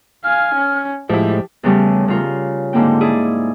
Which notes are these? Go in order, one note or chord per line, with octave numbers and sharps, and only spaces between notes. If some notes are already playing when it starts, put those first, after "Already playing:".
F5 G#5 F6
C#4
A2 F3 G#3 E4 G4 C5
E2 C#3 G3 A3
C#3 F4 A#4
G#2 D3 A#3 C4 G5
E4 G#4 D5